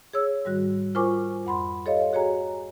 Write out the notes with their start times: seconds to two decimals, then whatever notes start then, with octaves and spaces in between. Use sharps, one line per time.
0.13 G#4 C#5 E6
0.45 G#2 D#3 G3 F#4 F#6
0.95 F4 A#4 C5 G#5 C#6 D6
1.45 F2 F#5 B5 C6
1.85 G4 A4 C#5 D#5 F5
2.13 F#4 G#4 C#5 G#5 A#5